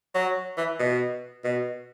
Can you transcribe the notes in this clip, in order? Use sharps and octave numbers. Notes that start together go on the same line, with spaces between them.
F#3
E3
B2
B2